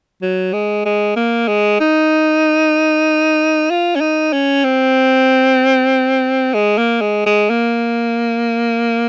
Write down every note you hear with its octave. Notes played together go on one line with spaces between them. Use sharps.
F#3
G#3
G#3
A#3
G#3
D#4
F4
C#4
D#4
C#4
C4
G#3
A#3
G#3
G#3
A#3